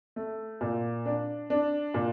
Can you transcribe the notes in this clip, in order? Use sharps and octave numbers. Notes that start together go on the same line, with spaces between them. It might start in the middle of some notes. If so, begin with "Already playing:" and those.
A3
A#2
D4
D4
A#2